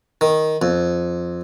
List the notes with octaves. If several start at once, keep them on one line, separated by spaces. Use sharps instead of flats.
D#3
F2